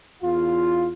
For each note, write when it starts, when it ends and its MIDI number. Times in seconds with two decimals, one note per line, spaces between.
0.22 0.91 40
0.22 0.91 65